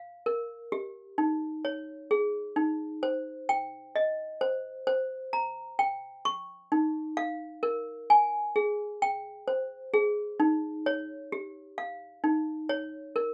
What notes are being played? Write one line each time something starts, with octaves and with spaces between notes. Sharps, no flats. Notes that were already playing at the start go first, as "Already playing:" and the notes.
Already playing: F5
A#4
G4
D#4
C#5
G#4
D#4
C5
G5
D#5
C5
C5
A#5
G5
C#6
D#4
F5
A#4
G#5
G#4
G5
C5
G#4
D#4
C#5
G4
F5
D#4
C#5
A#4